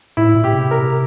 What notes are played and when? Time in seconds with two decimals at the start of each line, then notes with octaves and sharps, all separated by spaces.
0.17 A2 E4
0.35 A#2
0.44 G4
0.53 C3
0.71 A#4